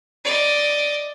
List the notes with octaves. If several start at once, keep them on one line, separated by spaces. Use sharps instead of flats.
D5 D#5